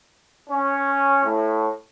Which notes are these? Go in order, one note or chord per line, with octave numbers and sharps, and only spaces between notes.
C#4
A2